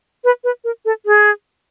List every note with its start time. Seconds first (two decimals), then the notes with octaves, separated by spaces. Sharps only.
0.24 B4
0.44 B4
0.64 A#4
0.85 A4
1.06 G#4